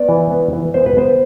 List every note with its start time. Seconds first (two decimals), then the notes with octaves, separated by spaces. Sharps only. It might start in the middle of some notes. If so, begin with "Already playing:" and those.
Already playing: B3 D5
0.09 E3
0.31 B3
0.53 E3
0.74 B3 C5
0.86 B4
0.97 B3 C5